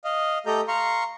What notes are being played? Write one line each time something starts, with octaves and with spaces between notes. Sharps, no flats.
D#5 F5
A3 G4 A4 D#5 A#5 G6
F5 A#5 C6 C#6